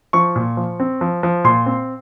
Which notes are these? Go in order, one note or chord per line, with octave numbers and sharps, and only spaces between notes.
F3 C#6
A#2
F3
C4
F3
F3
A#2 C6
C4